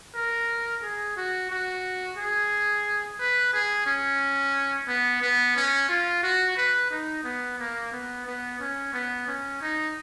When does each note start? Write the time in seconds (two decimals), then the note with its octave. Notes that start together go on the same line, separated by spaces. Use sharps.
0.14 A#4
0.82 G#4
1.16 F#4
1.50 F#4
2.17 G#4
3.19 B4
3.53 G#4
3.86 C#4
4.88 B3
5.21 B3
5.56 C#4
5.89 F4
6.23 F#4
6.57 B4
6.90 D#4
7.24 B3
7.59 A#3
7.92 B3
8.26 B3
8.59 C#4
8.93 B3
9.27 C#4
9.62 D#4